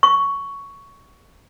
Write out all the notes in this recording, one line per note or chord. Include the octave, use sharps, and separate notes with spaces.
C#6